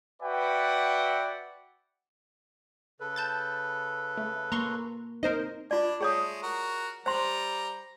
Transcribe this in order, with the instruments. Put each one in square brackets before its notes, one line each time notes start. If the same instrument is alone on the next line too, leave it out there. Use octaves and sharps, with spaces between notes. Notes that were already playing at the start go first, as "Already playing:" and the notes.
[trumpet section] F#4 B4 D5 E5 F#5 G5
[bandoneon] C#3 A4 B4
[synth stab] A5 G6 A6
A3
[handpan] A#3 [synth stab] A#5 C6 C#6
[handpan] C4 D#4 [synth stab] A#4 C5 D#5
[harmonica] D4 [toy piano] F4 D5
[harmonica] G#3 A3 [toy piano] G#4 C#5 D#6
[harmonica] F#4 A#4
[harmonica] G3 A#5 [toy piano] C5 C6